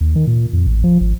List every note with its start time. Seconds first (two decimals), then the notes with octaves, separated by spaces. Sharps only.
0.01 D#2
0.16 D#3
0.27 A#2
0.53 F2
0.67 A1
0.84 F3
1.01 G#1